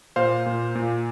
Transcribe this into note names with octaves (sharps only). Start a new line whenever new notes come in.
A#2 C5 F5
A#2
A#2